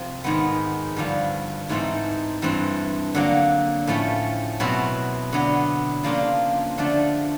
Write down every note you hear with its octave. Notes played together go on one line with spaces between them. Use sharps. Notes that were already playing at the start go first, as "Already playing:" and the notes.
Already playing: C3 F3 C4
G#2 D#3 G#3 B3
G2 D3 F3
G#2 E3 A3 C4 D#4
G2 E3 A3 C4
D3 F#3 A#3
A2 F3 A3 C#4
B2 F#3 A3 C4 E4
D3 F#3 B3
C#3 F3 A#3 D4 F4
D3 F3 A3 D4